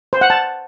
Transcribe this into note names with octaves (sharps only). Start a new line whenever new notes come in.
C5
F#5
A5